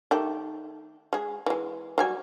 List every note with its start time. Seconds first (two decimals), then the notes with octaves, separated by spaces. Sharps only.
0.11 D#3 A3 G4
1.13 G#3 G#4
1.46 E3 G#3
1.98 F#3 G3 G#5